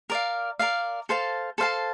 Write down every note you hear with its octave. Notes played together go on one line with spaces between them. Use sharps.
A#4 D5 F5
A#4 D5 F5
A4 C5 F5 A5
A4 C5 F5 A5